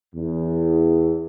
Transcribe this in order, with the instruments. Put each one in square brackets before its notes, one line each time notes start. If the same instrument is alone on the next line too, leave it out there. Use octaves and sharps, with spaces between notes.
[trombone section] E2